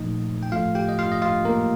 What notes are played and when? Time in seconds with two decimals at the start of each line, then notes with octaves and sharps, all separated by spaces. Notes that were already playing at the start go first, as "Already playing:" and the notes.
Already playing: A#2 F3 A3 D#4 D#5
0.43 G5
0.52 A2 F3 A3 F4 F5
0.75 G4 G5
0.89 D#5
0.99 F4 F5
1.12 D#5
1.22 F4 F5
1.45 A#3 A#4